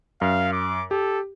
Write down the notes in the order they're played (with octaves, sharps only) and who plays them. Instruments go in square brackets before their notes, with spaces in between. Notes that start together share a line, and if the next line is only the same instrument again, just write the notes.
[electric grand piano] F#2 [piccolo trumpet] F5
[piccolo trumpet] D6
[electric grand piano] G4 [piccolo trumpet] A4